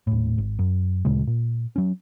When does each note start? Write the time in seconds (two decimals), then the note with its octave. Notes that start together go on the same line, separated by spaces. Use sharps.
0.07 D#1 A2
0.38 G#1
0.59 F#2
1.05 D2 A#2 C#3 G#3
1.27 A#2
1.76 F#3 C#4